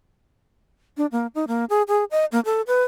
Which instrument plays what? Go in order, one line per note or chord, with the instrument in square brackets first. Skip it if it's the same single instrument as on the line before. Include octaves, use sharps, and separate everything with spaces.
[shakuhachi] D4
A#3
D#4
A#3
G#4
G#4
D#5
A#3
A4
B4